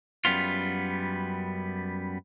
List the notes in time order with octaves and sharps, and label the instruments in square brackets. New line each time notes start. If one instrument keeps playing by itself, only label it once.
[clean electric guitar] F#2 G3 B3 F4